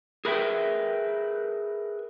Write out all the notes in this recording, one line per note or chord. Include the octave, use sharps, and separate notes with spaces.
G#4 A#4 B4 E5 F#5 G5